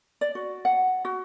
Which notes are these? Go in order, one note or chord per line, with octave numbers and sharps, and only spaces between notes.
D5
F#4
F#5
F#4